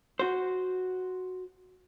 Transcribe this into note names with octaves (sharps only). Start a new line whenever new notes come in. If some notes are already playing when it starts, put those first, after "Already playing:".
F#4 C5